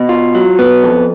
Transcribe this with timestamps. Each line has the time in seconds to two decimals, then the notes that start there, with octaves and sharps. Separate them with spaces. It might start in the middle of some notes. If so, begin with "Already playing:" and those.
Already playing: B2
0.09 F4
0.35 F#3
0.59 B3
0.83 F2